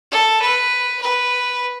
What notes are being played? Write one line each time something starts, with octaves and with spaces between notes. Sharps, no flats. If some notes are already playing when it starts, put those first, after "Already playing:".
A4
B4
B4